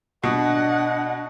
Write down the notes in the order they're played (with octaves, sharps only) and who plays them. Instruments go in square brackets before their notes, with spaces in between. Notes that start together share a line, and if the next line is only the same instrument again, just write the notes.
[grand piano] B2 [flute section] D4 D#5 [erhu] F#5